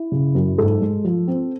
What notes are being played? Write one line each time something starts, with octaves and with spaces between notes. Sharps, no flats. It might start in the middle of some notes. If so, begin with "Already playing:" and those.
Already playing: E4
C#3
F#2
G#2 A4
G#3
F3
C4